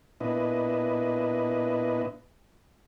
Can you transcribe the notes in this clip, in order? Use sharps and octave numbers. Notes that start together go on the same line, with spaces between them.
A#2 B3 D4 E4 B4 D#5